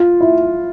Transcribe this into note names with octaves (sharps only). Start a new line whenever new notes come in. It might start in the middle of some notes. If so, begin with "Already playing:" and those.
Already playing: F4
E4